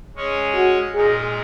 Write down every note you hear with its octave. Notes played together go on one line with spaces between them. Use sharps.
G#3 C#4 G#4 C#5
F#4
A#2 G#3 D#4 G#4 A#4